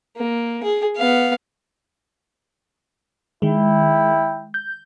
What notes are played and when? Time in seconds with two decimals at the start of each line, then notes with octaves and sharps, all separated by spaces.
0.17 A#3
0.64 G#4
0.96 B3 F5
3.42 D#3 G#3 E4 G5
4.54 G6